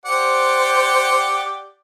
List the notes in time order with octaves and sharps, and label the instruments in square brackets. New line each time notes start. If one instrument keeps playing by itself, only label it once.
[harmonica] G4 D5 F#5 [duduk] C5